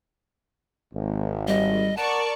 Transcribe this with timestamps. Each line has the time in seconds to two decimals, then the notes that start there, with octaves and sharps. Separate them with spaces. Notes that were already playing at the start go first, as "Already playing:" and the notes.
0.94 G#1
1.48 G3 D#5
1.97 A#4 D5 F#5 A5 C#6